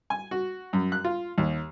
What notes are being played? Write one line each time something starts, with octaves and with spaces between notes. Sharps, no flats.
G#5
F#4
F#2
F#6
F4
D#2